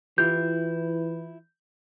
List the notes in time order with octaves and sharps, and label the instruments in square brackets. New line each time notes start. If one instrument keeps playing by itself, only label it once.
[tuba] E3 [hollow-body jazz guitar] E4 F4 G4 [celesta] G6